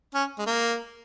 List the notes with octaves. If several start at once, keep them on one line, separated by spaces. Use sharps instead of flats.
C#4
G#3
A#3